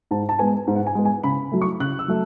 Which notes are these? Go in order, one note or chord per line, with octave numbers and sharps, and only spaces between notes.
G#2 A5
A5
G#3 B3 G#5
G#2
F#5
G#5
G#3 B3
G#5
C#3 B5
F#3 A3
C#6
C#3 F#6
E6
F#3 A3